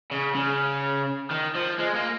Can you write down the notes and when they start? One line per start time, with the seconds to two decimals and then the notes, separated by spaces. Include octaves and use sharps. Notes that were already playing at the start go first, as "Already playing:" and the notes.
0.11 C#3
0.35 C#3
1.30 D#3
1.55 F3
1.78 G#3
1.95 A#3